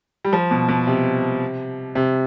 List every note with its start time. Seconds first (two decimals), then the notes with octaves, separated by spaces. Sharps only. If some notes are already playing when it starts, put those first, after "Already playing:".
0.25 G3
0.33 F3
0.51 B2
0.68 B2
0.87 C3
1.95 C3